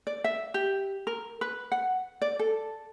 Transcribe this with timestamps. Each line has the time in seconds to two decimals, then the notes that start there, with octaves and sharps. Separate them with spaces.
0.07 D5
0.24 E5
0.54 G4
1.07 A#4
1.41 B4
1.72 F#5
2.22 D5
2.39 A4